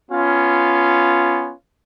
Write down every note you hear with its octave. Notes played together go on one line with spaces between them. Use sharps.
B3 C#4 F4